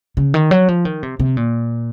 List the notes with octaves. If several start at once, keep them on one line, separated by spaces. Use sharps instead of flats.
C#3
D#3
F#3
F3
D#3
C3
C3
A#2